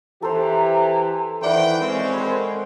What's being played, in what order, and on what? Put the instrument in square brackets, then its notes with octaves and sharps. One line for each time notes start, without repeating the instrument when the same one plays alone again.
[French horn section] E3 G4 [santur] A4 C5 [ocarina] A#5
[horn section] D#3 B4 G5 [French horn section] E3 [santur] C5 D5 F#5 [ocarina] E5
[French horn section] G#3 [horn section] C4 C#4 [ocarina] A#4
[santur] B4 C5